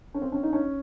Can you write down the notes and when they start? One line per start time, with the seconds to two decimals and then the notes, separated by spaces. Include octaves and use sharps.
0.14 C#4
0.22 C4
0.32 C#4
0.43 D#4
0.53 C#4